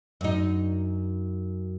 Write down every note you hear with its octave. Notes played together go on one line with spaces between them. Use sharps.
F#2 D#4